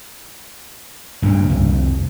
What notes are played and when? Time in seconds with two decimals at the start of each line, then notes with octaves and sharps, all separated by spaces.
1.22 G2 A#2 C#3
1.49 C2 F2